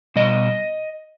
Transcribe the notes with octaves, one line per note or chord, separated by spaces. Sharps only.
B2 G3 D#5